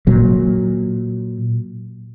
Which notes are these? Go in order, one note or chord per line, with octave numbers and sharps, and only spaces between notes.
A#2 F#3